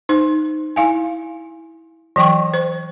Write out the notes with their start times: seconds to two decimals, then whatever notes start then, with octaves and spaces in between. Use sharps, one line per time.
0.09 D#4 C5
0.76 E4 F5 G#5
2.16 E3 F#3 G5 C#6
2.54 C5